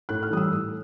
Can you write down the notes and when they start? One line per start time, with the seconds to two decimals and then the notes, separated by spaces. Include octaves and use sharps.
0.09 A2 F#6
0.23 F6
0.31 E3 G3 D#6
0.37 E6
0.51 A2